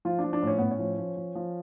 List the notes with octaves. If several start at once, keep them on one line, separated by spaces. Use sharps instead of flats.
F3 F4
D4
F3
D4
A2 C#4
A2 B3
C#4
F3
F3
F3
F3